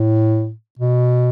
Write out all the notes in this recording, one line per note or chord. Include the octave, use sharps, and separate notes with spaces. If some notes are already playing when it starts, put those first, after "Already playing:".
Already playing: A2
B2